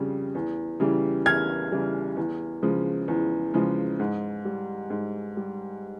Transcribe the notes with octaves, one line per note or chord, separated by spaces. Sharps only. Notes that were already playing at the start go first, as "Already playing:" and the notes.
Already playing: F2 C#3 G3
E2
C#3 E3 G3
E2 F6 G#6
C#3 E3 G3
E2
C#3 F3 G#3
E2
C#3 F3 G#3
G#2
G3
G#2
G3